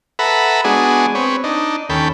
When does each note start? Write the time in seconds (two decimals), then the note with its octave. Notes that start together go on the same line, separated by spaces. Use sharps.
0.19 A4 B4 E5 F#5 A#5 B5
0.64 G#3 B3 D4 F#4 G#4
1.15 C4 B4 C#5
1.44 D4 D#4
1.90 D#2 C#4 A4 G5 B5